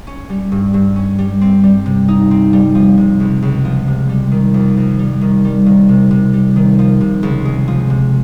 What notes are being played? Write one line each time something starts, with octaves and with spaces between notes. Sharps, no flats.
C#4
G3
G2
G2
C#4
G3
C4
G3
C3
D#4
C4
G3
F3
C3
C#2
C#2
F3
C3
G3
D#3
F2
F2
G3
D#3
G3
D#3
C3
C3
G3
D#3
F3
C3
C#2
G#3
F3
C3